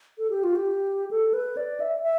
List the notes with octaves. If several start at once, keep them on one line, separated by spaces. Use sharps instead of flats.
A4
G4
F4
G4
A4
B4
D5
E5
E5